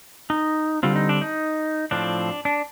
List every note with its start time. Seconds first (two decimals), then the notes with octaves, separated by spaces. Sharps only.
0.30 D#4
0.83 D3 G3 C4 F4
0.96 D#4
1.09 D4
1.21 D#4
1.91 A2 F3 C4 D4
2.45 D4